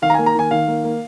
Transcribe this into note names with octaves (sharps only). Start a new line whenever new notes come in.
D#3 F5
A#5
G#5
A#3
A#5
D#3 G#5
D#3 F5
A#3
A#3